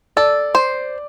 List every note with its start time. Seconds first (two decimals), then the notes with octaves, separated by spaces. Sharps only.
0.17 A4 D5
0.55 C5